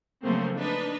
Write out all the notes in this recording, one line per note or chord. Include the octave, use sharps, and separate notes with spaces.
C#3 F3 F#3 A3 A#3 C4
D4 D#4 B4